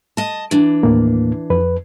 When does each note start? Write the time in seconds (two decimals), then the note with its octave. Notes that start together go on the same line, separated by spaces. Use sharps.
0.17 D#5 A5
0.51 E3 D4
0.83 D#2 A2 A#3
1.50 F2 B4